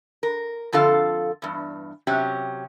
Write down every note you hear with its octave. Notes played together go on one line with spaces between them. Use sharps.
A#4
F2 D3 F4 A4 F5
E2 G2
C3 F#3 C#4 G4